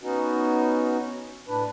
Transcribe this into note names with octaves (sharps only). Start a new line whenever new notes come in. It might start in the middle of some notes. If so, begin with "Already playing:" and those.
B3 C#4 D#4 F#4
A2 D4 B4